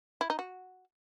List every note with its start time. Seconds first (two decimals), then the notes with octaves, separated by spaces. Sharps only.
0.21 E4
0.30 D#4
0.39 F#4